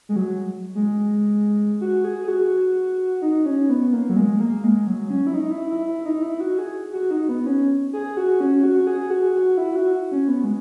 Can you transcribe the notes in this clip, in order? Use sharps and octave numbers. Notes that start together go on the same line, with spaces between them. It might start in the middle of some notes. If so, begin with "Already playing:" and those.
G#3
F#3
G#3
F#4
G#4
G#4
F#4
D#4
C#4
B3
A#3
F#3
G#3
A#3
G#3
F#3
C#4
E4
D#4
E4
E4
E4
D#4
E4
F#4
G#4
F#4
D#4
B3
C#4
G#4
F#4
C#4
F#4
G#4
F#4
F#4
E4
F#4
C#4
B3
G#3